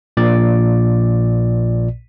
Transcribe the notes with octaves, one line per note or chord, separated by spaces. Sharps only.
A#1 A#2 D5